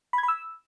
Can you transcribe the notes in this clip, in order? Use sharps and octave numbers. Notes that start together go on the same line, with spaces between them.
B5
G#6
B5
E6